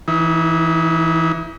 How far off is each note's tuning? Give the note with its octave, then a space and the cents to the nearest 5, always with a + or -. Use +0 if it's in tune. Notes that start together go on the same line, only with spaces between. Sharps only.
E3 +0 D#4 +35